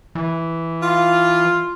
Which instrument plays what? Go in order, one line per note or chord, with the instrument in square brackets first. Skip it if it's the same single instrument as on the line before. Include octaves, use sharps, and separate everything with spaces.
[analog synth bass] E3
[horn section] F4